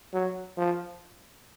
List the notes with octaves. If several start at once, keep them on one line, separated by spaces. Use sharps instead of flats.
F#3
F3